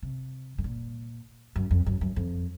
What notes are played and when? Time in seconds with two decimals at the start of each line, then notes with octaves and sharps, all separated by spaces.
0.03 C3
0.58 G#2
0.64 A#2
1.56 F#2
1.71 F2
1.86 F#2
2.01 F#2
2.16 F2